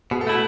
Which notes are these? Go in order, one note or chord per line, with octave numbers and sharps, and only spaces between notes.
B2 G#4
A4
A3 E4 F#4